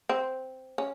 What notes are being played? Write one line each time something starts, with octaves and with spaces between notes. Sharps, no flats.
C4
C#4